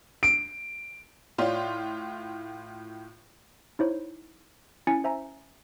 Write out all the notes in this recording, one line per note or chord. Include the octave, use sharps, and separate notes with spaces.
D7
A2 F4 C#5 D5 F5 C6
D#4 E4 C5 C#5
C#4 E4 G#5 A6 C#7
C5 E5 G#5 A#5